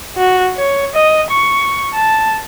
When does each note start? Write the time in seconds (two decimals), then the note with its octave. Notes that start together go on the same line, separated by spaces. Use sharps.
0.18 F#4
0.56 C#5
0.95 D#5
1.31 C#6
1.95 A5